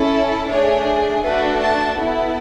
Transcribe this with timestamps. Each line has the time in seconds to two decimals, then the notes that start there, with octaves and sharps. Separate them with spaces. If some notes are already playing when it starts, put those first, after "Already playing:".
Already playing: C#4 E4 A4
0.50 A3 D4 G#4 C#5
1.23 A3 D4 F#4 A4 B4
1.61 A5
1.97 B3 E4 A4